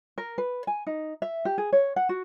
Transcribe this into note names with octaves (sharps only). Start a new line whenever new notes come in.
A#4
B4
G#5
D#4
E5
G4
G#4
C#5
F#5
F#4